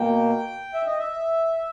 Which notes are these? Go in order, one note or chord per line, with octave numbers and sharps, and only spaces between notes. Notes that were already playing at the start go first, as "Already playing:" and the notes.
Already playing: B2 A#3 G5
E5
D#5
E5